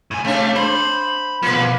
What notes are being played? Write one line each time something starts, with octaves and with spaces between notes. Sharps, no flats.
A2 G#5
C3 A3 D4
C5 B5
B2 F3 A#3 B4